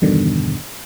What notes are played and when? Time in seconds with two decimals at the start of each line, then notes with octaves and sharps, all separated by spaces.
0.01 E2 G2 B2 D3 D#3